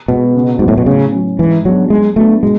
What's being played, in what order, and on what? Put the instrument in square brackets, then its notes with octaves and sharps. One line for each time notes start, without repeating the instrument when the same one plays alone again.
[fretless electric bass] B2 [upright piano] G#3 B3 F#4 B4
[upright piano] C#3
[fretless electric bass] G#2 [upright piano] F#3 B3 F#4
[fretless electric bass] A2
B2
[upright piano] A2 [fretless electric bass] C#3
[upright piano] F#3 C#4
[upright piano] G#2 [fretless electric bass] E3
[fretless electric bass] F#3 [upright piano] G#3 B3 D4 F#4
[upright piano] F#3 [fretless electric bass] G#3
[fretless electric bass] A3 [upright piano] B3 D4 F#4 B4
[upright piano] B2 [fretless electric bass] G#3